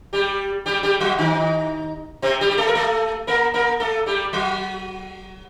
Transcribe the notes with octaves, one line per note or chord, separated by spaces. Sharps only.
G3 G4
G3 G4
G3 G4
F#3 F#4
D#3 D#4
C3 C4
G3 G4
G4
A3 A4
A#4
A3 A4
A#3 A#4
A#3 A#4
A3 A4
G3 G4
F#3 F#4